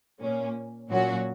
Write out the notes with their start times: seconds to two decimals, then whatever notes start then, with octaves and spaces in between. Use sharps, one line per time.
0.21 A#2 A#3 C#4
0.89 A#2 F#3 C#4 F#4